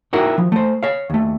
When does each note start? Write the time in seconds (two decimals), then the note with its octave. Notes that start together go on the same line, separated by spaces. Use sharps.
0.13 D#4 E4 F#4 A#4 G5
0.38 F3
0.52 A3 C5
0.83 C#5 F5
1.10 D#2 A3